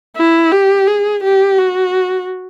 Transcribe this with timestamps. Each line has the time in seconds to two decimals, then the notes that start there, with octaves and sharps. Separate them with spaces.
0.17 E4
0.52 G4
0.88 G#4
1.24 G4
1.59 F#4